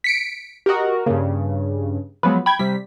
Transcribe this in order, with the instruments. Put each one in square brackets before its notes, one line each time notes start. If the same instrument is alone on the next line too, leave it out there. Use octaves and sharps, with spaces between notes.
[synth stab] B6 C#7 D7
[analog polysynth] F#4 A#4 [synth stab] G4 D#5
[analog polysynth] G2 C#3 [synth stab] A#3
[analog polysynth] F3 F#3 B3 [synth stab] G#3 B4
[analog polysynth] G5 [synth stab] B5 G#6
[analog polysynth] C3 G3 [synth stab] B6